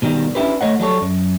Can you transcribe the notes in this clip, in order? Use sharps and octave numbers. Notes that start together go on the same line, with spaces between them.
B2 D#3 G3
C#4 D4 E4 G4 B4
A3 C#5 D#5 F#5
F#3 G3 A4 C#5
F#2